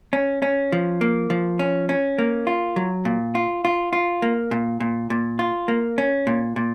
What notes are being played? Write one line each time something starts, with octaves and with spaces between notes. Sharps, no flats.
C#4
C#4
F3
A#3
F3
C#4
C#4
A#3
F4
F#3
A#2
F4
F4
F4
A#3
A#2
A#2
A#2
F4
A#3
C#4
A#2
A#2